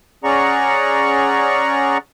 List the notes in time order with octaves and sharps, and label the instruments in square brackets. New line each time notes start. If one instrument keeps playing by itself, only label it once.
[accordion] C#4 G#4 D5 F#5 A#5 C#6